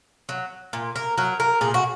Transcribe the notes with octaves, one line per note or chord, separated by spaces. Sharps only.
F#3
A#2
A#4
F#3 A#4
A#4
A#2 G#4
F#4